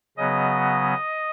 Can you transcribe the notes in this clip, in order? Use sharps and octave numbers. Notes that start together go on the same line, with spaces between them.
C#3 F#3 B3 D#5